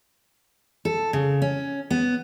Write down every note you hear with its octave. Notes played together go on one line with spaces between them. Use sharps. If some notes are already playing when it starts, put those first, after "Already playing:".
A4
C#3
C#4
B3